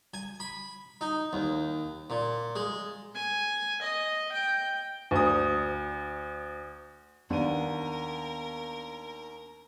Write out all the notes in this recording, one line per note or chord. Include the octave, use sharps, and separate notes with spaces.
G#5
B5
D#4
D#2
A#2
G#3
G#5
D#5
G5
D2 D#6
D#2 B3 D4 A#4 D#7